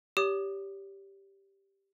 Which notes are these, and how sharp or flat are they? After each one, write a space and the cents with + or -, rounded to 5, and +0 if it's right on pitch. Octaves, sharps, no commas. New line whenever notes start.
G4 +0 C#5 +35 D#6 -10